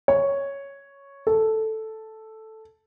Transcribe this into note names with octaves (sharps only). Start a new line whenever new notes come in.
C#5
A4